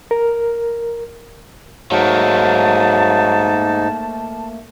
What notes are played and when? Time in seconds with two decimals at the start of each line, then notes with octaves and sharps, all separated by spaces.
0.11 A#4
1.91 G#2 F#3 A3 A#3 D#4 A5